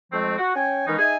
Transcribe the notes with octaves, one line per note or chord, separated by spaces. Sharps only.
F2 F3 G#3 A3 C4
F#4
C#4 C#5 G5 G#5
D#3 E3 G#3 B3 C#4 D#4
D#4 G#4 E5 G#5